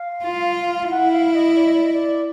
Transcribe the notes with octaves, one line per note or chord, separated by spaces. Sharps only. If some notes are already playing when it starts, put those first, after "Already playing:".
Already playing: F5
F4
F5
E4 F#5
F5
D#5
D5
D#5
D5
D#5
D5